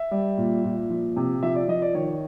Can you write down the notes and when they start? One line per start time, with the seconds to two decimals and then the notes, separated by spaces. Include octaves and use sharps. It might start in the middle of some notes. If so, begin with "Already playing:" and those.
Already playing: E5
0.11 G3
0.38 A#2
0.64 A#2
0.90 F3
1.16 C3
1.43 F3 E5
1.55 D5
1.68 F3 D#5
1.82 D5
1.94 D#3 C#5